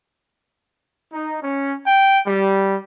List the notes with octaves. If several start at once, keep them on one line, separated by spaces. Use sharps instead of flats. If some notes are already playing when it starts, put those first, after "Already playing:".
D#4
C#4
G5
G3